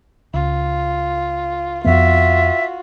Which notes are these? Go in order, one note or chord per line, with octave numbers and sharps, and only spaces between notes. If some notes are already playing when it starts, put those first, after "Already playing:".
C#2 F4
F2 B3 F4 F#4 E5